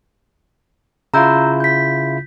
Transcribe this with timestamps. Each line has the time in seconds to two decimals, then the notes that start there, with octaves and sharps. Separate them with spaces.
1.14 C#3 E4 F4 A#5 E6 G6
1.60 G6 B6